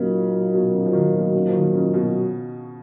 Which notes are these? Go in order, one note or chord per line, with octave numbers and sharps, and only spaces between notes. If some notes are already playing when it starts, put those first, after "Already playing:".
Already playing: A#2 C#3 F#3 A#3 D#4
B2
C#3
F3
D#3
B2
C#3
F3
D#3
C#3
B2